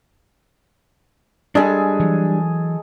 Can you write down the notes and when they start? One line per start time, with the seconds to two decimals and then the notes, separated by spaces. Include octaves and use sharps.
1.55 G3 G#3 D4 G#4 A4
2.00 E3 F#3